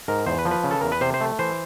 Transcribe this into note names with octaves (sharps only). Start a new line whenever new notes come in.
G#2 A#4
E2 C5
B4
F3
B4
C#3
A4
E2 A#4
B4
C3 C5
C5
A3
E3 C5